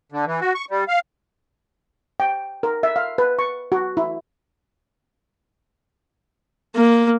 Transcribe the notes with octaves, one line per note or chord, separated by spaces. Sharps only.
D3
E3
F#4
C#6
G3
F5
G5
A#4
E5
F5
B4
C#6
F#4
E4
A#3